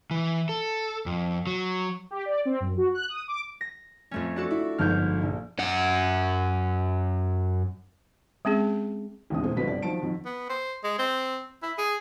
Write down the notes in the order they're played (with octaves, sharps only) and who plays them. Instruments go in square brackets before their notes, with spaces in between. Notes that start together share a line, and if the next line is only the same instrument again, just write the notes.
[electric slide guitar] E3
A4
F2
F#3
[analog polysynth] G4
D5
C4
F#2
F#4
F#6
D#6
D6
[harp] A#6
F2 A3 C#4
D4 F#4 A4
[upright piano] E4
[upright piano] G1 F2 G#2 [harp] F6 G6
[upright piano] A#1
[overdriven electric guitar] F#2 F#5
[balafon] G#3 C4 C#4 G#4
[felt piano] A1 D#2 G#2 C3 D4 D#6
A#2 E3 G#3 C4
C2 B2 D3 F3 B4 B6
G1 C3 D5
D#3 F3 F#3 A5 D7
F2 D#3 F#3
[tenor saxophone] B3
C5
G#3
C4
E4
G#4